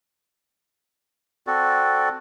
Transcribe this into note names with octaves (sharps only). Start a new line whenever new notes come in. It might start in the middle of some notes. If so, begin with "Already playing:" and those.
C4 F#4 A4 D5